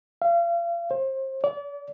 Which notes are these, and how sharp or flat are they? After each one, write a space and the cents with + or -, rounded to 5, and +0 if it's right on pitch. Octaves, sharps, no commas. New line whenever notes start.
F5 -35
C5 +30
D5 -35